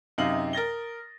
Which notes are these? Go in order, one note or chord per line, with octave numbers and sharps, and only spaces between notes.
F#2 C3 D#4 F5 D#6 F#7
A#4 A6 A#6 G7